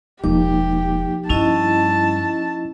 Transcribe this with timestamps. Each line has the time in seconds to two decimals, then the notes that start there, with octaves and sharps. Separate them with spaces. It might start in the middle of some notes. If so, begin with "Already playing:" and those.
0.24 E1 F3 A#3 D#4 G4 D6
1.29 G2 C#4 E4 D#5 A5